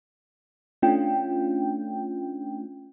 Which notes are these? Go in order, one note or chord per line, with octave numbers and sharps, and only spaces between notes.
A3 C#4 D4 F4 G5